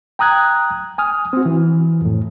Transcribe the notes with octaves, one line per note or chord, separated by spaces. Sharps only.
G5 A#5 D#6 F#6 G#6
G#5 D#6 F6
C4 F#4
E3
F2 A2